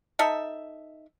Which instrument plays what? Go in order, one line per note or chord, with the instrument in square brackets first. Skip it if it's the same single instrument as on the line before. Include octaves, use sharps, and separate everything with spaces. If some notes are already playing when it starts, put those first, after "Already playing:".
[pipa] D#4 A4 D#5 E5